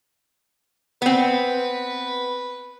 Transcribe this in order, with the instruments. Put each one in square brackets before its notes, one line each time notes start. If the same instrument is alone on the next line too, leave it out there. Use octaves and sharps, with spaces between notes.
[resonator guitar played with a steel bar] B3 C4 [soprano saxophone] B4